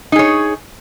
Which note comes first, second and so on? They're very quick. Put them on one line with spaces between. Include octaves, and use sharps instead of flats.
D#4 G#4 C#5